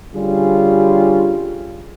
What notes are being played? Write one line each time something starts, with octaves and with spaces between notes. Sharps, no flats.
D3 G3 C#4 F4 G#4